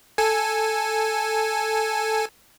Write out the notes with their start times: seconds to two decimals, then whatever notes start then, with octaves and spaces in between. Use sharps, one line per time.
0.18 A4 G#5